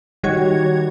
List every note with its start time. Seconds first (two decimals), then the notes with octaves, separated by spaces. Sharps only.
0.23 D#3 G3 F#4 C#5 G#6